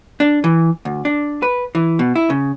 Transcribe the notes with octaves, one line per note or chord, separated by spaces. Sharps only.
D4
E3
D2
D4
B4
E3
B2
E4
C#3